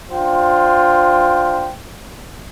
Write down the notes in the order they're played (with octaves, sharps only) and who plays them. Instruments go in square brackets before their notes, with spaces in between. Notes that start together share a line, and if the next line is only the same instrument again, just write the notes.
[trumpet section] D4 F4 C5 G5